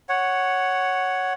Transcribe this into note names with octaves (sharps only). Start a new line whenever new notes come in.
C#5 F#5